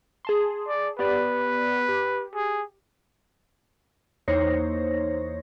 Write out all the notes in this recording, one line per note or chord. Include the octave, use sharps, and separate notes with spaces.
G#4 A5 C6
D5
B3 G4 B4 D5
G4
G#4
E2 A#3 D#4 C5 C#5 A#6